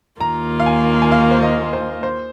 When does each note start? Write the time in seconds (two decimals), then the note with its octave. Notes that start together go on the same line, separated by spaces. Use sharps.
0.21 D#2 D#3 A#3 F4 A#5
0.60 F5
0.66 G#5
1.02 G#5
1.12 F5
1.31 C5
1.42 D#5
1.73 C5
2.03 C5